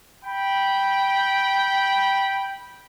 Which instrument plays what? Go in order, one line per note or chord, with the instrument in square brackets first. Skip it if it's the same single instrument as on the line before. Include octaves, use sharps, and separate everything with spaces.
[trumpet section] G5 B5